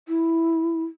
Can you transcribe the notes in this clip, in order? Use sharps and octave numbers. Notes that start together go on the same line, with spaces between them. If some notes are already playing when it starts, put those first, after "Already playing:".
E4